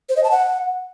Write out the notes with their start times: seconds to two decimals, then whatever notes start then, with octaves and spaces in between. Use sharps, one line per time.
0.09 C5
0.16 D#5
0.24 A5
0.31 F#5